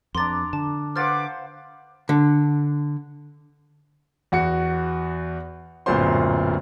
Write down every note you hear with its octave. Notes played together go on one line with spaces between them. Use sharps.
F2 D4 A#5 C6 D6 A6
D3 A5
B4 C5 F5 F#5 D6 F6 A6
D3
E2 F#4 C#7
D1 F#2 A#2 B3 C5 C6